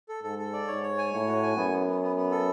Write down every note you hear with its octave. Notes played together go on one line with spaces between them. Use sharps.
A4
G#2 A4
A4
D5
G#2 C#5
C#5
G#5
A2 C#5
F#4
G#5
F#2 B3
B3
B3
B3
B3
A4